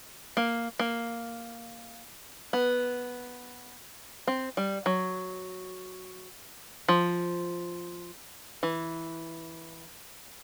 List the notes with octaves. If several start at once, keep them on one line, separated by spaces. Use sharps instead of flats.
A#3
A#3
B3
C4
G3
F#3
F3
E3